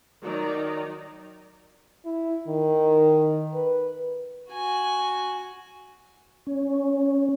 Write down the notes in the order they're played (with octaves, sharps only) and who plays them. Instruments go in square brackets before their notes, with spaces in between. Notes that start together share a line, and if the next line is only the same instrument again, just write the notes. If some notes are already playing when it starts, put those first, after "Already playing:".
[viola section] D#3 F#3 D#4 D5 A#5
[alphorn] E4
D#3
B4
[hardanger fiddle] F#4 G#5
[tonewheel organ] C#4